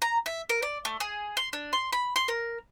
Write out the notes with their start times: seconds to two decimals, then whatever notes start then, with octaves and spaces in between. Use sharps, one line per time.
0.02 A#5
0.26 E5
0.49 A#4
0.62 D5
0.85 A3
1.00 G#4
1.37 C6
1.53 D4
1.73 C6
1.93 B5
2.16 C6
2.28 A#4